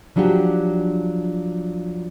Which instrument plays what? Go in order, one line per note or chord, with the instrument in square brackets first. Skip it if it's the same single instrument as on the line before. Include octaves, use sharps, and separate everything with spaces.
[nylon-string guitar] F3 F#3 D4 F#4 G4